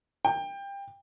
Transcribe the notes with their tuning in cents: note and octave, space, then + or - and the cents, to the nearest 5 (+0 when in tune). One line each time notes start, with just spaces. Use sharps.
G5 +25